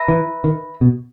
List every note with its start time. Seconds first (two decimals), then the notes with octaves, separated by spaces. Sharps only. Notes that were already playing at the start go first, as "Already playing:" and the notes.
Already playing: B4 E5 A#5
0.08 E3
0.44 D#3
0.81 B2